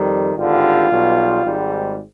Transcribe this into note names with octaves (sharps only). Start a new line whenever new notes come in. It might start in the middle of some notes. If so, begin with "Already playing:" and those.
Already playing: F2 D#3 G3
G#1 G2 D3 G3 F4
B1 B2 G3
G#1 G#2 G3